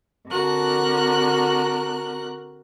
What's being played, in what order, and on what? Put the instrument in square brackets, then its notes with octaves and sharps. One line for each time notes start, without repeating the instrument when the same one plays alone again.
[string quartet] D3 C4 F#4 A#4 F#6